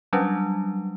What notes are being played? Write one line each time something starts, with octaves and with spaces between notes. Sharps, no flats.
F#3 G3 C#4 D4